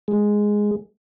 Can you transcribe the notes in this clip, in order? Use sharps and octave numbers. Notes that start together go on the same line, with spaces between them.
G#3